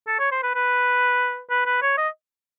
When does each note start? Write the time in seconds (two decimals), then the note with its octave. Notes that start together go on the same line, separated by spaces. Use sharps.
0.07 A4
0.19 C#5
0.31 C5
0.43 B4
0.55 B4
1.50 B4
1.66 B4
1.82 C#5
1.98 D#5